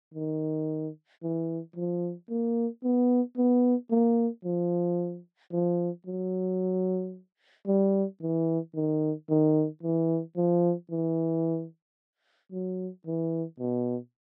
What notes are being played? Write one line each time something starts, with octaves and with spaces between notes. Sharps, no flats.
D#3
E3
F3
A#3
B3
B3
A#3
F3
F3
F#3
G3
E3
D#3
D#3
E3
F3
E3
F#3
E3
B2